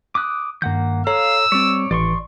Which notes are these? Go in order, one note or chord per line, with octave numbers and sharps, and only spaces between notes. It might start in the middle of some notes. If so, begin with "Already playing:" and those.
D6 D#6 F#6
G2 D#3 A#3 F#5 G6
A4 C#5 F5 A#5 E6
G3 C4 C#5 D5
G#1 A2 E3 D5 C6 C#6